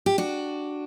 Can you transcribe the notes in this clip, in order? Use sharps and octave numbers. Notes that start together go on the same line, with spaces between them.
G4
D4 F#4